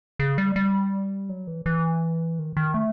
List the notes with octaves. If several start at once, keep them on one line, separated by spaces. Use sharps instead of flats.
C#3
G3
G3
F#3
E3
E3
D#3
D#3
A3